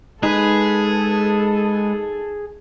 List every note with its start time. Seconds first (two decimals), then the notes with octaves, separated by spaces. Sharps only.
0.23 G#3 D#4 G#4 A4 B4